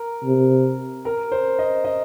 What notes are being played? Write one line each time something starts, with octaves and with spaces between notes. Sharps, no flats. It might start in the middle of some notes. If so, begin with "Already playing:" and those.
Already playing: A#4
C3
A#4
C5
D#5
D#5